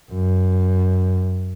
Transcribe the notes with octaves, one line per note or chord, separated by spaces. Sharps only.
F#2